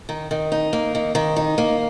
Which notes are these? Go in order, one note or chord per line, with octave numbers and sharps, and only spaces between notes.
D#3
D#3
D#4
A#3
D#3
D#3
D#4
A#3